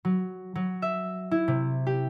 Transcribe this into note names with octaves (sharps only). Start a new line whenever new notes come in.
F#3
F#3
E5
E4
C3
G4